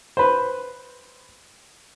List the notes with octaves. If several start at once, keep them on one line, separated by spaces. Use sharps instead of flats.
B4 C5